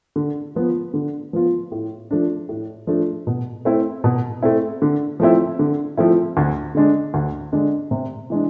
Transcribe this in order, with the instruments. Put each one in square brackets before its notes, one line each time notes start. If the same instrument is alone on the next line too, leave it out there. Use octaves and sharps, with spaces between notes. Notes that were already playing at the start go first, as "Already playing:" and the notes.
[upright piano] D3
F3 B3 F4
D3
F3 B3 F4
A2
F3 A3 D4
A2
F3 A3 D4
B2
A3 C4 E4
B2
A3 C4 E4
D3
F3 A3 C4 E4
D3
F3 A3 C4 E4
D2
D3 G#3 D4
D2
D3 G#3 D4
C3
E3 G#3 D4